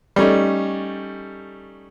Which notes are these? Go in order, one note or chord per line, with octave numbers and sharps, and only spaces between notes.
G3 A3 C#4 D#4